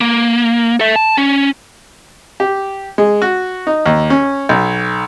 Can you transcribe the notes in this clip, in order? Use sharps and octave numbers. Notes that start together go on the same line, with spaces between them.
A#3
A4 E5
A5
C#4
G4
G#3
F#4
D#4
D#2
C#4
B1